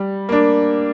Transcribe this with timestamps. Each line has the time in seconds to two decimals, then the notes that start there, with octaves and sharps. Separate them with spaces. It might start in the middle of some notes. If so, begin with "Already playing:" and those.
Already playing: G3
0.29 A#3 D4